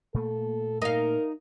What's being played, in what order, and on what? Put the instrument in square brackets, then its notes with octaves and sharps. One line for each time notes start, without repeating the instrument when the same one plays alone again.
[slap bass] A#2 A3 A#3 [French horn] A4
[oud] D#4 F5 [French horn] A#4